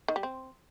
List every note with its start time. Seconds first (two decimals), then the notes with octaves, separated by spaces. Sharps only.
0.08 D#3
0.16 G3
0.23 C4